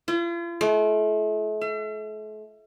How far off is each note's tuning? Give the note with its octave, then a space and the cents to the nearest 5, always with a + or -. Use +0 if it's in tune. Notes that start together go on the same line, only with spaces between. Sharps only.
F4 -45
A3 -40
E5 +45